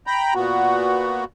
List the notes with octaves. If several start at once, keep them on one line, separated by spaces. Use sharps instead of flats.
G5 A#5 B5
A#2 B3 F#4